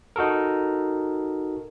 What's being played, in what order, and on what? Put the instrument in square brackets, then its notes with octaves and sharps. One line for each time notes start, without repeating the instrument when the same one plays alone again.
[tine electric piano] D#4 F#4 A4 A#4